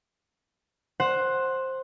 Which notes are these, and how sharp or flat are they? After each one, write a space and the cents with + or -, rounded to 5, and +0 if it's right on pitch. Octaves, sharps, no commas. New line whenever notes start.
C5 +10 F#5 +0